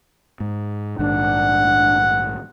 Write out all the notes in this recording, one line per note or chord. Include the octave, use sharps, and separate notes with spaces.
G#2
A#1 G#2 D#3 D4 F#5